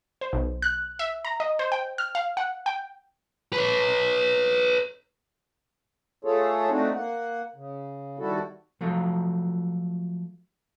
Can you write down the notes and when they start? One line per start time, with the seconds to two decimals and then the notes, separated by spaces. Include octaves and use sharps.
0.21 C5
0.33 B1
0.62 F#6
0.99 E5
1.25 A#5
1.40 D#5
1.59 C5
1.72 G5
1.98 F6
2.15 F5
2.37 F#5
2.66 G5
3.53 B4 C#5
6.25 A3 F4 G#4 A4 C#5
6.70 A3 C4 D4 D#4 F#4
6.95 A#3 F#5
7.56 C#3
8.19 D#2 G3 E4 F#4 A4
8.81 F3 F#3 A3 F4